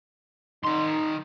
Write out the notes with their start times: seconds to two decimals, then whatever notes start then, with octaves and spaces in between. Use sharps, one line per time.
0.65 D#3 D#4 C6